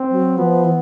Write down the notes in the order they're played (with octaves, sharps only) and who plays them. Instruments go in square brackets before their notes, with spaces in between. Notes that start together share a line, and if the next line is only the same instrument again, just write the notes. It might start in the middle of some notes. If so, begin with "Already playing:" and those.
Already playing: [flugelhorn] C4
[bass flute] F#3
[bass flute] F3 [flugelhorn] B3
[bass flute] E3